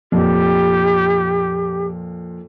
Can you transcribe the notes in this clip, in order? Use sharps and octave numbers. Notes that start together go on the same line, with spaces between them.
F2 A#2 G4